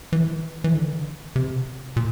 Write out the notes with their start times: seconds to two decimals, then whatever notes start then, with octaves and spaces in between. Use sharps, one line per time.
0.13 E3
0.64 E3
0.74 D3
1.36 C3
1.96 A#2